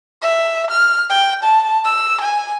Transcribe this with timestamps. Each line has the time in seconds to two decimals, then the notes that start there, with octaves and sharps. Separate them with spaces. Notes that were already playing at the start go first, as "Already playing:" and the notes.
0.22 E5
0.71 F6
1.10 G5
1.43 A5
1.85 E6
2.21 G#5